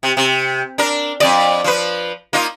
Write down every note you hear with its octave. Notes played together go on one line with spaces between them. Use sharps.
C3
C3
D4 A#4
F2 D5
F3 B4
A#3 D#4 F4